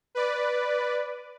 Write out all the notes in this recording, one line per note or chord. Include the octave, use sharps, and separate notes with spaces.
B4 D5